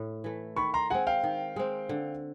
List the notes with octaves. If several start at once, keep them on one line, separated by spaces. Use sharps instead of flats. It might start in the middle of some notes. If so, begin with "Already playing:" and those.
Already playing: A2 A3
E3 A3
D#3 B5 C#6
A#5 C6
G#3 C4 F#5 G#5
F5 G5
D#3
G#3 C4
D3